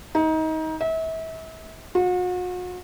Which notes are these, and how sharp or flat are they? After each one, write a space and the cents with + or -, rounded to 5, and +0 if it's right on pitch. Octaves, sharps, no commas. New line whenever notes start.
D#4 +25
E5 -35
F#4 -40